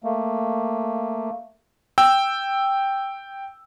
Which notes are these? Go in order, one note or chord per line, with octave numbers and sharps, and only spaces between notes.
A3 A#3
G5 E6